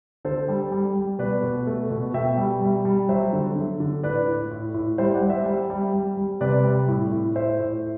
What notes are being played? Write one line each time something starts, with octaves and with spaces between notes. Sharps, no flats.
D3 A4 C5
G3
G3
G3
B2 B4 D5
B2
A3
B2
B2 E5 G5
G3
G3
G3
F#3 C5 E5
D3
D3
D3
A2 B4 D5
A2
A2
A2
G3 C5 E5
D5 F#5
G3
C5 E5
G3
G3
G3
G3
C3 B4 D5
G3
A2
A2
A2 C5 E5
A2